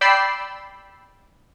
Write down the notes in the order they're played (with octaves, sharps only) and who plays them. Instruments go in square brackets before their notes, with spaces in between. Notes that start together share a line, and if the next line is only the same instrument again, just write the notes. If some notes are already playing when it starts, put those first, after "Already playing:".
[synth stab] D5 G5 B5 E6 C7